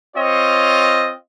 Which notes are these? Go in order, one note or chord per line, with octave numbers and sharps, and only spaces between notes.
C4 F4 C#5 D#5